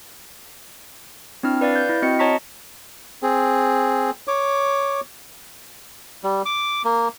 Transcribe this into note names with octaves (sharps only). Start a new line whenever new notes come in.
C4 D4 E4 F6
B4 D5 F5 A6
G6
E4
C4 F#4 D#5 C#7
C#5 D#5 A5 A#5 C#6 B6
C4 G#4
C#5 D6
G3
D6
A#3